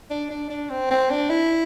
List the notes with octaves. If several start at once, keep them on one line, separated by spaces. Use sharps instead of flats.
D4
D4
D4
C4
C4
D4
E4